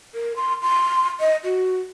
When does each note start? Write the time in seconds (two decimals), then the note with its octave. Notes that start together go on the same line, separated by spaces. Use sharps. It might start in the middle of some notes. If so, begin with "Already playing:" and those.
0.15 A#4
0.36 C6
0.62 C6
1.20 D#5
1.44 F#4